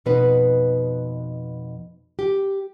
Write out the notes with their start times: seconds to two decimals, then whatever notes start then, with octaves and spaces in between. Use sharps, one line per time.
0.06 F2 B2 B3 D#4 B4
2.19 G4